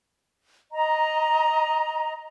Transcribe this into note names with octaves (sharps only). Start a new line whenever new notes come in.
D#5 A#5